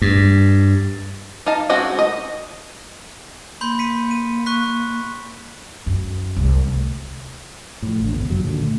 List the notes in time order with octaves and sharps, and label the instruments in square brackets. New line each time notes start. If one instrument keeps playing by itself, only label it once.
[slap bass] G2
[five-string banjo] D#4 F5 A5
G#3 C4 C#4 F#4
D#5
[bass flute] A#3 [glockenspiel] B5 C6 G6
[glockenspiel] B6 C#7 D#7
D#7
C#6 F#6 B6
[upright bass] F#2
C2
D2
[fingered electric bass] A2 F3
A1 D#2 D3
G1 C#2 B3
C#2 F#2 D#3 F#3
A#2 D3
A3